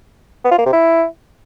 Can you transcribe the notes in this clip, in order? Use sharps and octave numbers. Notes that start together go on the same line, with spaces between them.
B3
F4
A#3
C3
E4